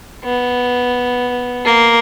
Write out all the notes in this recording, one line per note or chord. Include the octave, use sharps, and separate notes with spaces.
B3
A#3